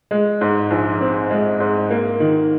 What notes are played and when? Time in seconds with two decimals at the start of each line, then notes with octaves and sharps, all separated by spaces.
0.11 G#3
0.41 G#2
0.71 A#1
1.01 C4
1.30 G#3
1.60 G#2
1.91 A#3
2.20 D#3